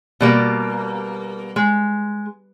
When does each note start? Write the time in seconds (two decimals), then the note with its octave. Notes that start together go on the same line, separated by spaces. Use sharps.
0.21 B2 G3 A#3
1.56 G#3